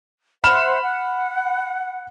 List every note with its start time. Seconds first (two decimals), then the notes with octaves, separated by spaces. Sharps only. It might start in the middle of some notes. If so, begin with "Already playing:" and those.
0.44 C5 E5 F#5 B5 F6 E7
0.83 F#5